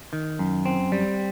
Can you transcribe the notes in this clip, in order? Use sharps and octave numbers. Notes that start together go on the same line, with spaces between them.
D#3
F#2
C4
G3